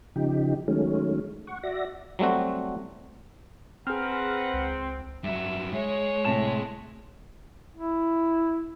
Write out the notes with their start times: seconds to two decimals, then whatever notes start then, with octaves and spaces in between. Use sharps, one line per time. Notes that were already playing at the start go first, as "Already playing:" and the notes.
0.16 C#3 F3 D#4 G4
0.68 D#3 F#3 G#3 A3 C#4
1.47 F#5 C#6
1.63 F#4 D5 E5 A#6
2.19 F#3 G3 A3 C4 F#4
3.87 C4 G#4 B4 F#5 A#5 F6
4.53 C#2
5.24 G2 F#3 E5
5.74 G#3 C#5
6.25 A2 C3 A5 E7
7.75 E4